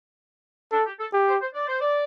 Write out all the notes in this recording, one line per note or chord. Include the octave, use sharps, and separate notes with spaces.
D4 A4
G4
A4
G4
C5
C5
D5
C5
D5